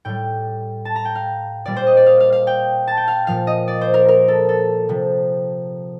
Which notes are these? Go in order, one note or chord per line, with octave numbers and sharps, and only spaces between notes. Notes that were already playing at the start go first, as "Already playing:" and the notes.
A2 G3 G5
A5
A#5
G5
F5
A#2 G3 D5
C5
D#5
D5
F5
F5
F5
G5
A5
G5
F5
A#2 F3 F5
D#5
D5
C5
A#4
A#4
A4
A4
C3 F3